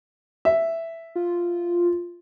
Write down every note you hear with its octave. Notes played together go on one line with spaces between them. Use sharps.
E5
F4